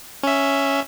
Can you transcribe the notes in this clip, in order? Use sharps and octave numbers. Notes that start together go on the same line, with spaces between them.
C#4 E5